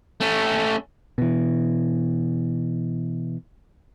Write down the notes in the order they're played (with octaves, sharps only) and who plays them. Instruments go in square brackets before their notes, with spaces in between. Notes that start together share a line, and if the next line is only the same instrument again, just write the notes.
[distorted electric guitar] A3 C#4
[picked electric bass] B2 E3